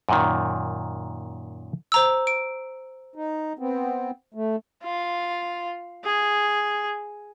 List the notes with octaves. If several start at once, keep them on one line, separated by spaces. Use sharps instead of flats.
F#2 A#2 D#3
C5 A#5 E6
D7
D#4
B3 C4
A3
F4
G#4